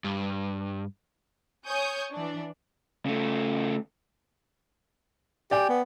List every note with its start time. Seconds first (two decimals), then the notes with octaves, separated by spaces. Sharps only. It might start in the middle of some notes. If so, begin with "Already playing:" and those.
0.04 G2
1.67 C#5 G#5 C#6 D#6 G6
2.13 E3 D4
3.06 C#3 A3
5.51 G4 D5 G5 G#5
5.69 B3